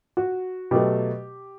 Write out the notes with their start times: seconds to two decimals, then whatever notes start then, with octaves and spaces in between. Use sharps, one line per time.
0.17 F#4
0.71 B2 F#3 A3 G4